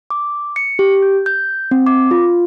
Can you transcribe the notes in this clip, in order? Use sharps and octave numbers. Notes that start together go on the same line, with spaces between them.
D6
C#7
G4
G6
G6
C4
D6
F4